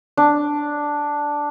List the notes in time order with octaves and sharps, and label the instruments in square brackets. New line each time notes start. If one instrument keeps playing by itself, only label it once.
[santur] D4